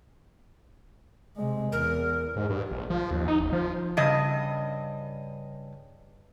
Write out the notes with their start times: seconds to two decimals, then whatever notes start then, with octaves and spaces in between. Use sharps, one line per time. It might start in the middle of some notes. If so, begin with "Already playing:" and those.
1.37 C3 G#3
1.72 E2 A#4
2.36 G#2
2.50 G2
2.71 A#1
2.90 F3
3.11 D#2
3.28 D#4
3.41 F#1
3.52 F3
3.97 G2 C#3 D#5